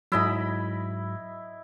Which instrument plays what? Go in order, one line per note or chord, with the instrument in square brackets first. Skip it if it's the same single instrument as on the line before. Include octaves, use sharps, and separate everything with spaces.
[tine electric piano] G#2 F#3 [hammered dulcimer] E4 D#5 B5